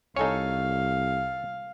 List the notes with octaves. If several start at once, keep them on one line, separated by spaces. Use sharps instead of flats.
C2 D#4 A4 C#5 F5 G#5